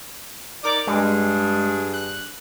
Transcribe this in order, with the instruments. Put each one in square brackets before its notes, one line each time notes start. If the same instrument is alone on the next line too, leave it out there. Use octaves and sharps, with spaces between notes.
[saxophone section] D#4 A#4 D5 [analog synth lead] D6
[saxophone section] G2 G#4 [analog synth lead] G#3
[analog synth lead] F#6